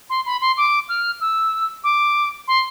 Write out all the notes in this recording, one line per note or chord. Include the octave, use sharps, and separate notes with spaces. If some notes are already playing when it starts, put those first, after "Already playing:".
C6
B5
C6
D6
F6
E6
D6
C6